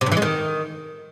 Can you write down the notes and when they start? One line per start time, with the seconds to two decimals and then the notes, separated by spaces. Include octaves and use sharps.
0.01 C3
0.06 G2
0.12 E3
0.17 G#3
0.22 D#3